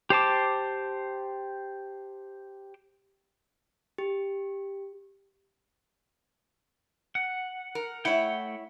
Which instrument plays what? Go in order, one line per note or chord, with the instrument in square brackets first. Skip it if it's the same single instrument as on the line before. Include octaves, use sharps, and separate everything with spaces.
[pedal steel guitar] G4 C5 A5 D6
[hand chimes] G4
[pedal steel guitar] F#5
[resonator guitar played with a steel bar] A#4
[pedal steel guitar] A3 F#5 G5 [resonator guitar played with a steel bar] E4 C#5